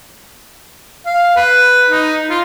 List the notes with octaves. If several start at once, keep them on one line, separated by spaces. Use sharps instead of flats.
F5
B4
D#4
F4